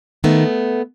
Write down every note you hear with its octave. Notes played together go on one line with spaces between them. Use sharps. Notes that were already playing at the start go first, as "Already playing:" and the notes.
D#3 A3 B3